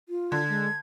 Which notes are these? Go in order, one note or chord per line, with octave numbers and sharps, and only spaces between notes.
F4
D3 G#6
G#3